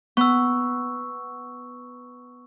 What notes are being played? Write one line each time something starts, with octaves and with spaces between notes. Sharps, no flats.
B3 C#6 E6